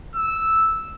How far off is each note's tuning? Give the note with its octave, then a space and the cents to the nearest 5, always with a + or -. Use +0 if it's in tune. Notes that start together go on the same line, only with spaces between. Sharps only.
E6 -5